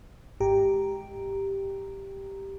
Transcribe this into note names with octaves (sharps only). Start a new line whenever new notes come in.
G#1 G#2 G4 A#5